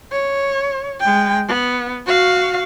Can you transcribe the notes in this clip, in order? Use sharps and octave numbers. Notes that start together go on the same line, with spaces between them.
C#5
G#3 G5
B3
F#4 F5